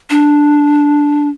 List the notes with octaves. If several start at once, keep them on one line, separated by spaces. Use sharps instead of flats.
D4